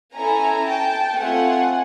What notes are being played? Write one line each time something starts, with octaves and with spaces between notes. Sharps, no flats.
C#4 E4 A4 G#5 A#5
G5 A5
A3 C4 F4 F#5 G#5